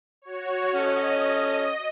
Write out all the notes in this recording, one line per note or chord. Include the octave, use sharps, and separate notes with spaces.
F#4 C#5
C#4 A4 D#5